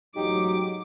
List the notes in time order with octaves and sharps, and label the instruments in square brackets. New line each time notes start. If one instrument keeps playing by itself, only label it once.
[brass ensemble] A1 G#2 F#3 [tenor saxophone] D#4 [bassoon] G4 [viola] D6